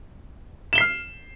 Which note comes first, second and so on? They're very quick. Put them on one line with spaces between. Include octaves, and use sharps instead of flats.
E7 G7 C7 F6